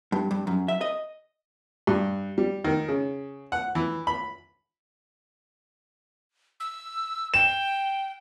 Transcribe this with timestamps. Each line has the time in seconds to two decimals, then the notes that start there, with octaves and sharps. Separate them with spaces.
0.12 G2
0.31 G2
0.47 F#2
0.68 E5
0.81 D#5
1.87 G2
2.38 G3
2.64 D#3
2.88 C#3
3.52 F#5
3.75 E3
4.07 B5
6.60 E6
7.34 G5 E7